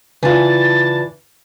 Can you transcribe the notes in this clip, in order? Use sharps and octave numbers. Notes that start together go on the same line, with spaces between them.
C#3 E3 D4 F4 A5